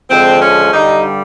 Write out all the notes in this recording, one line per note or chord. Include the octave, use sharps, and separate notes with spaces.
D3 F3 G#3 C4
C#4
G2 D3 G3 D#4